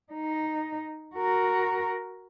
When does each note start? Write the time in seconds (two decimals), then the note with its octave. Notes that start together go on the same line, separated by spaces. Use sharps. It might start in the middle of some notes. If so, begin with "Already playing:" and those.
0.13 D#4
1.16 F#4 A#4